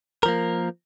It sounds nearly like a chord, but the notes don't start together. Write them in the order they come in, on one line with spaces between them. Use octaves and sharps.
A#4 F3 A#3